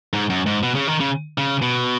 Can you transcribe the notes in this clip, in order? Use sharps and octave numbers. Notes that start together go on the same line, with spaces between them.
G#2
F#2
G#2
B2
C#3
D#3
C#3
C#3
B2